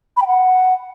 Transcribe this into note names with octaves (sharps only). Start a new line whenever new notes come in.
B5
G5
F#5